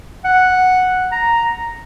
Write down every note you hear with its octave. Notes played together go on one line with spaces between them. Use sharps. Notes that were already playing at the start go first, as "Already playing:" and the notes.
F#5
A#5